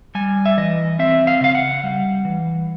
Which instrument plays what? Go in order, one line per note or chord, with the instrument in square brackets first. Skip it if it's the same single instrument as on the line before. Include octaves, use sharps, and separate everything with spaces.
[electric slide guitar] G3 G#5
E5
E3 D#5
C4 E5
F5
C#3 F5
F#5
G3
E3